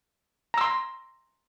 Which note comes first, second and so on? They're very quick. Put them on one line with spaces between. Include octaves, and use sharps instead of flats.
A#5 E6 C6